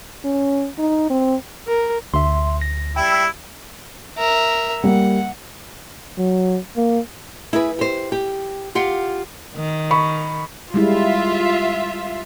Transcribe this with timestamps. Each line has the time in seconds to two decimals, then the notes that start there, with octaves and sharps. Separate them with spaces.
0.24 C#4
0.78 D#4
1.10 C4
1.67 A#4
2.14 D2 E5 C6
2.61 A#6
2.96 G3 E4 E5 G5
4.18 A#4 E5
4.84 G3 A#3 F#5
6.18 F#3
6.77 A#3
7.53 E4 G#4 B4
7.79 G4 C5
8.12 G4
8.75 F4 G4 F5 F#5
9.55 D#3
9.91 B5 C#6
10.74 G3 G#3 E4 F4 E5